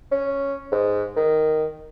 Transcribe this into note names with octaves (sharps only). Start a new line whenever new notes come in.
C#4
G#2
D#3